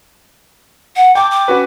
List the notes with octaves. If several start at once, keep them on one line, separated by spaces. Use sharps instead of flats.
F#5
G5 A5 D6
D6
C#4 F#4 B4